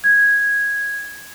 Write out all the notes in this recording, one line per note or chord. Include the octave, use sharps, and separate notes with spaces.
G#6